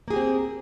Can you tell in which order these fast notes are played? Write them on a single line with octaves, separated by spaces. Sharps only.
A#3 G#4 G4 C4